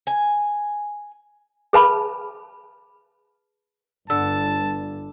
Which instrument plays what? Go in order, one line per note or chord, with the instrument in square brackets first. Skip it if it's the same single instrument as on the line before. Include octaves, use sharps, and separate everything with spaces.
[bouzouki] G#5
[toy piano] G#4 B4 A5 B5
[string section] G1 [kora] D3 [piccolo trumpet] A5 [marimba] E6